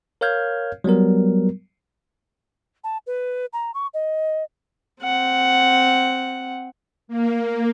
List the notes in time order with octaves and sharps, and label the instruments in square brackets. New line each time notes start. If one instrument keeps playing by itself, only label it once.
[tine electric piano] A#4 C#5 F5 F6 G6 G#6
F#3 G3 B3 A#4
[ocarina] A5
B4
A#5
C#6
D#5
[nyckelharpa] C4 F#5
[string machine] A#3